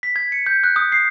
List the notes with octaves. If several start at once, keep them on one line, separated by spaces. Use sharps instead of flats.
B6
G#6
C#7
G6
F#6
D#6
C7